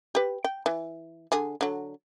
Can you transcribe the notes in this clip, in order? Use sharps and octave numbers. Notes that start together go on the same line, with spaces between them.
G4 B4
G5
E3
D3 G#4
D3 F#3